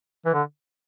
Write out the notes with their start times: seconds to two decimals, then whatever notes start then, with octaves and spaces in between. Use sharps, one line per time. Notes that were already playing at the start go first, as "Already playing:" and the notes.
0.25 E3
0.34 D3